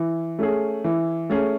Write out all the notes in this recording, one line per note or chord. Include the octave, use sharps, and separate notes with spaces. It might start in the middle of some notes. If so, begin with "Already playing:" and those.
Already playing: E3
A3 C#4 G#4
E3
A3 C#4 G#4